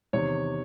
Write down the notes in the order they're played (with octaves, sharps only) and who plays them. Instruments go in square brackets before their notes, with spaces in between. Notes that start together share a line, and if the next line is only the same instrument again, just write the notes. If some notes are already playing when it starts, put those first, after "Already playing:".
[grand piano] E2 C3 D#3 C#5